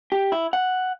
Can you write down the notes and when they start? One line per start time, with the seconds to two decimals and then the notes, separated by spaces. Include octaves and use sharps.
0.12 G4
0.32 E4
0.53 F#5